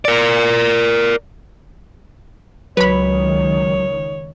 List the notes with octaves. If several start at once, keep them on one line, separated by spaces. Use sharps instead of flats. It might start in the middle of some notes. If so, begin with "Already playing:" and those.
A#4 D5
C#2 D#3 F#3 B4 C#5 B5